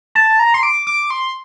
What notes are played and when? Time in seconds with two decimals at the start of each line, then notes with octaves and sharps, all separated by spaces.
0.15 A5
0.39 A#5
0.54 C6
0.63 D6
0.87 D6
1.10 C6